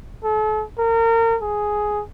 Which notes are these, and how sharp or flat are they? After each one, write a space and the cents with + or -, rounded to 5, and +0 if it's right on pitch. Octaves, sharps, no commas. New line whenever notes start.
A4 -40
A#4 -30
G#4 +5